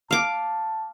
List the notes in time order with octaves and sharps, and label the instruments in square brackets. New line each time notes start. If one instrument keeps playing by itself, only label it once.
[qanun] F5 D6 [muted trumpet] A5